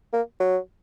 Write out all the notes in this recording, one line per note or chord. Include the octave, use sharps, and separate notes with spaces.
A#3
F#3